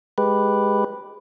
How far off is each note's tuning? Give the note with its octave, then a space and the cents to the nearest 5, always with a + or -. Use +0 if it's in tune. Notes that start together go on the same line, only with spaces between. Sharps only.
G#3 +0 G4 +0 B4 +0